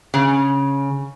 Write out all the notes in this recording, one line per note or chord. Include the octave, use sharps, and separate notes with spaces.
C#3